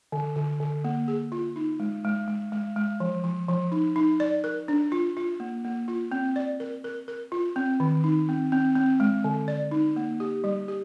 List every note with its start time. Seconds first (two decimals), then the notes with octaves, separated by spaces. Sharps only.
0.12 D3
0.36 D3
0.60 D3
0.84 A#3
1.08 G#4
1.32 F4
1.56 D#4
1.80 G#3
2.04 G#3
2.28 G#3
2.52 G#3
2.76 G#3
3.00 F3
3.24 F3
3.49 F3
3.72 D#4
3.96 D#4
4.20 D5
4.44 A#4
4.68 D4
4.92 F4
5.17 F4
5.40 A#3
5.64 A#3
5.88 F4
6.12 C4
6.36 D5
6.60 A#4
6.84 A#4
7.08 A#4
7.32 F4
7.56 C4
7.80 D#3
8.04 D#4
8.29 C4
8.52 C4
8.75 C4
9.00 G#3
9.24 D3
9.48 D5
9.71 D#4
9.96 A#3
10.20 G4
10.44 G3
10.68 G4